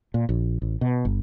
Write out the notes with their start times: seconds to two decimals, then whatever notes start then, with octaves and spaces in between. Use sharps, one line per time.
0.14 A#2
0.29 A#1
0.62 A1
0.81 B2
1.05 G1